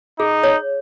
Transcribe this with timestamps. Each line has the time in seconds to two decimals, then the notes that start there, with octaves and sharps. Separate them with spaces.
0.19 D#4 G#4
0.44 C#5